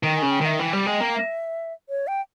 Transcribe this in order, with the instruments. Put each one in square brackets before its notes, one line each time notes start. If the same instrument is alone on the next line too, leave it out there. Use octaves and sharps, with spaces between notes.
[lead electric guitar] D#3 [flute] G5
[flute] G#5
[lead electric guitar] C#3
[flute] G5
[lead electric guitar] D#3 [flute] E5
[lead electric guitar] E3 [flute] G5
[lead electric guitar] G3
G#3
A#3
[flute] E5
C#5
G5